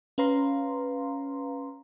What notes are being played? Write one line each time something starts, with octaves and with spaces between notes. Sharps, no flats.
C#4 B4 F5 A#5 C6